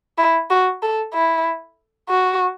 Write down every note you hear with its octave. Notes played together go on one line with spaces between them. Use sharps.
E4
F#4
A4
E4
F#4